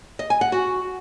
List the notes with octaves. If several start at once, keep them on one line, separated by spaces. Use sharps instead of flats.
D#5
G#5
F#5
F#4